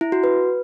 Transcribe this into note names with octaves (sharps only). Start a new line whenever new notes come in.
E4
F#4
B4